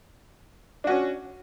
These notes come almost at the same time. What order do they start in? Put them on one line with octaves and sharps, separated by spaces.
D4 F#4 C#4